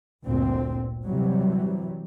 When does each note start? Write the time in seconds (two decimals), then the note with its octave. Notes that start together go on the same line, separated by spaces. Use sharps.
0.24 G1 D2 A#2 C4
1.05 C3 E3 F#3 G3